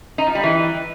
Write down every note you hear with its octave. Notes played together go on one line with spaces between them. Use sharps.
D#4
F3
G3
E3